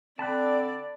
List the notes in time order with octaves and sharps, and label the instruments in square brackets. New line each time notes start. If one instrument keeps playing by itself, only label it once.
[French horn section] D3 [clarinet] C4 [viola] D5 [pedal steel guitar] A5 B5 F#6